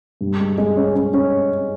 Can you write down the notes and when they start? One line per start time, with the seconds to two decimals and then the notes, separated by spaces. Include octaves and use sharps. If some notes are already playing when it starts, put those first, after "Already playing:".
0.21 G2
0.39 G#3
0.58 G#3
0.77 C#4
0.95 C#4
1.14 C#4